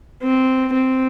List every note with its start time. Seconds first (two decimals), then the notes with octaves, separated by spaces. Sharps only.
0.23 C4
0.73 C4